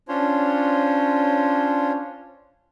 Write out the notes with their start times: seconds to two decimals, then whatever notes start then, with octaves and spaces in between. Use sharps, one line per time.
0.08 C#4 D4 F4 C5 C#5